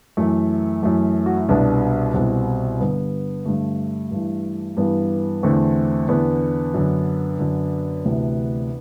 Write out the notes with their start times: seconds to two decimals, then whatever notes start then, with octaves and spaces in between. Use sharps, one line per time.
0.17 F#2 E3 A3
0.83 F#2 E3 A3
1.26 F#4
1.37 E4
1.49 C2 B2 B3 D4
2.14 C2 B2 C4 E4
2.80 G2 D3 B3
3.46 G2 D3 A3
4.11 G2 E3
4.77 G2 E3 B3
5.43 E2 D3 A3 C4
6.08 E2 D3 B3 D4
6.74 F#2 D3
7.39 F#2 D3
8.05 D2 C3 E3